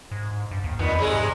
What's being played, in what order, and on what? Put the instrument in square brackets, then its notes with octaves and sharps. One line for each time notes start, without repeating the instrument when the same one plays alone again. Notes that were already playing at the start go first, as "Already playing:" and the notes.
[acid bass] G#2
G2
D#2
[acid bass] F2 [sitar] A#2 D#3 B3
[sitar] C3 G#3 G#4
[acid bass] G#2